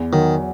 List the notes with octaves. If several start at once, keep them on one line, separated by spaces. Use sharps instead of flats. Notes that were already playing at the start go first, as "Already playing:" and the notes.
Already playing: E2
D#3 F#3